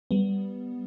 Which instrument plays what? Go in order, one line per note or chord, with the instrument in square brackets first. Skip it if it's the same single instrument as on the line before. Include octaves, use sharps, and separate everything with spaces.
[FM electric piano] G3 B3